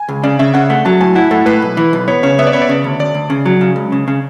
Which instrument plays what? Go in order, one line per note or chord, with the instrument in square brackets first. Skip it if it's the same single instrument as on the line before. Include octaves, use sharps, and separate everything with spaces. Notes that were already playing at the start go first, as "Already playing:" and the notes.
Already playing: [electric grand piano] G#5
[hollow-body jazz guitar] C#2
[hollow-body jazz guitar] C#3 [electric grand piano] D5
[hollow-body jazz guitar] C#3 [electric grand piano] E5
[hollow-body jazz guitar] C#3 [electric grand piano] F#5
[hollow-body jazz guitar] A3
[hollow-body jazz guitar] F#3 [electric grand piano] A5
[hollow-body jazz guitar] A2 [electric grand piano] G#5
[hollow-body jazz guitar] E4 [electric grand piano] F#5
[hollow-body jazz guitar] A2 [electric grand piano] A4
[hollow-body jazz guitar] A2 [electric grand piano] B4
[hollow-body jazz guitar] B1
E3
B1
[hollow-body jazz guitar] B3 [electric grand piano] C#5
[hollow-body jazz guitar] C#3 [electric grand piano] C#5
[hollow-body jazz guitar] B3 [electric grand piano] E5
[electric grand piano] D5
[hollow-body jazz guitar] B3 [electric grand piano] C#5
[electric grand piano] D5
[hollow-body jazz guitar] C#3
D2
[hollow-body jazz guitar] D2 [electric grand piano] D5
[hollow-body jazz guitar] D2
C#3
F#3
C#3
C#2
C#3
C#3